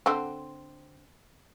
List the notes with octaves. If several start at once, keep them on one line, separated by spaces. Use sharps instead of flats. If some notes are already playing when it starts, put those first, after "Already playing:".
D3 C4